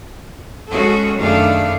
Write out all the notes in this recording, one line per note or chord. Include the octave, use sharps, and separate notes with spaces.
G#3 C#4 F#4 G#4 A4
F#2 D#3 A3 D4 G#4 F5